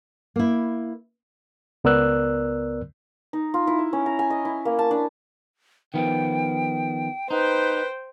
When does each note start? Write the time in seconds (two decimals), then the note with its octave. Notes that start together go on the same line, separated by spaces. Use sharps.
0.36 A#3 E4
1.84 C#2 B3 A#4 D5 E6 F#6
3.33 D#4
3.54 F4
3.67 E4
3.79 E5
3.93 C#4
4.06 A#5
4.19 G#5
4.30 D#5
4.45 E4
4.65 A#3
4.79 A5
4.91 D4
5.94 D#3 F3 B3 G5
7.31 D#4 B4 C5 G5